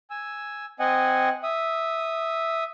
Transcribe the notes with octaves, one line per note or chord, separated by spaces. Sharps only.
G#5 E6
C4 D#5 F#5 G#5
E5 D#6